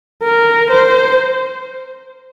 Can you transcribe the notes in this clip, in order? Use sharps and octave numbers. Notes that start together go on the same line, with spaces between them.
A#4
C5